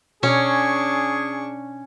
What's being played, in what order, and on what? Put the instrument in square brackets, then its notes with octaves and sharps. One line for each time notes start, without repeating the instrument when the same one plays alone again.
[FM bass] B2 [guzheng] C#4 [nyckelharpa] D4 C#6 [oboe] G#4